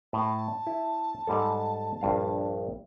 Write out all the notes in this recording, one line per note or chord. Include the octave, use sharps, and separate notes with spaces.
A2 A5
E4
G#2 G3 A4
A#1 G2 F5